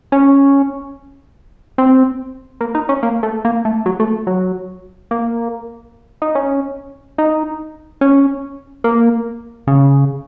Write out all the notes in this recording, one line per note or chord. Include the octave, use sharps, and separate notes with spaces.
C#4
C4
A#3
D#4
C#4
A#3
A3
A#3
A3
F#3
A3
F#3
A#3
D#4
C#4
D#4
C#4
A#3
C#3